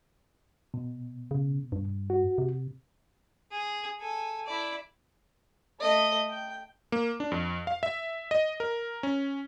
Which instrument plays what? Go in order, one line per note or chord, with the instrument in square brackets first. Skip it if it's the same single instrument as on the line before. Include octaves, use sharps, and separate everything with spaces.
[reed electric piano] B2
[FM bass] C#3
G2
[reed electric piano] F#4
[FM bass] C3
[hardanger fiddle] G#4
A4 G#5
E4 D5
A3 D#5
G5
[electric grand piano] A#3
D4
F2
F5
E5
D#5
A#4
C#4